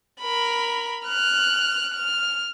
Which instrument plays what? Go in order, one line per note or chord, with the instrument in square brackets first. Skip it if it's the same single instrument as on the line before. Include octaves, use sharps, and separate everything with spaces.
[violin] A#4 B5
F6 F#6
F6